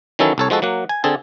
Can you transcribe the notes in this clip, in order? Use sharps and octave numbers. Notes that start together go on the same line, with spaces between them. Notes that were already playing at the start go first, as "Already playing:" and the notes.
D#3 E3 F#3 C#4 E4 A4
C2 A4 C#5
F3 G#3 F#4 A4
F#3 A#3 F#5
G#5
D3 C4 G#4 A4